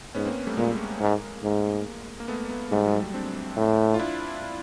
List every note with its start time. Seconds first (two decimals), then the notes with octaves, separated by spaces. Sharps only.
0.15 G#2 B3 C#4
0.25 A#3 C4
0.47 G3 A3
0.57 A#2 G#3 A#3
1.00 G#2
1.43 G#2
2.20 A#3
2.28 A3 B3
2.50 A3 B3
2.71 G#2 G3 A3
2.86 F#3 G#3
2.99 G3 A3
3.14 C4 D4
3.57 A2
3.94 F4
3.99 D4 E4